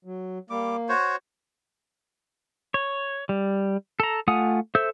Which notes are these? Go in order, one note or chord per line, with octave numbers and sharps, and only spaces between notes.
F#3
G3 A#3 D6
F#4 C5 C#5
C#5
G3
A4 A#5
A3 F4 F#5 G#5 D#6
A4 C5 E5 E6 G6